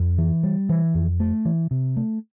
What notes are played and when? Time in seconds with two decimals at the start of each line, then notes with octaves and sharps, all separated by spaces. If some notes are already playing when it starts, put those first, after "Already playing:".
Already playing: F2
0.18 E3
0.43 G3
0.69 E3
0.94 F2
1.20 A3
1.45 E3
1.71 C3
1.97 A3